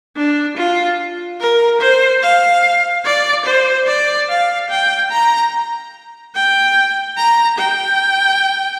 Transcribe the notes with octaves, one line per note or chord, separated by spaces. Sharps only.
D4
F4
A#4
C5
F5
D5
C5
D5
F5
G5
A#5
G5
A#5
G5